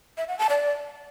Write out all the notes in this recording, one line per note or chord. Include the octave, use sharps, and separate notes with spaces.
E5
F#5
A5
D5